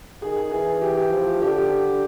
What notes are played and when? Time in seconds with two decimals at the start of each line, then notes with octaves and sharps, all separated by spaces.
0.22 D#3 G#4
0.36 G#4
0.51 E3 G#4
0.82 G4
0.97 G4
1.11 F3
1.41 D3 G4
1.57 G4